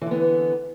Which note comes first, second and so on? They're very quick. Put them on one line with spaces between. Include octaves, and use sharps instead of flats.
E3 D3 B3